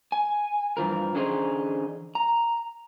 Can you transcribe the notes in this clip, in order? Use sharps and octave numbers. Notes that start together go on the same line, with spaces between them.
G#5
G2 E3 F3 A#4
D3 E3 C#4 D#4 G#4 C5
A#5